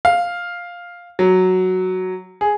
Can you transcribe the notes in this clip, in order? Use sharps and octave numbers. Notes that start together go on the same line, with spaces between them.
F5
F#3
G#4